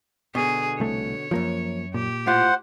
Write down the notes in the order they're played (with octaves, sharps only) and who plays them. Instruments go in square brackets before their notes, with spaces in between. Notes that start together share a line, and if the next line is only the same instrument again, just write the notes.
[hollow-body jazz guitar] B2 D3 [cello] G#4
[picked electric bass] C2 A3 [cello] C#5
[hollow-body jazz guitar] C2 F#2 [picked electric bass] F3 A#3
[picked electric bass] A#2 [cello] G4
[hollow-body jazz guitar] A2 F4 F5 [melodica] C5 F#5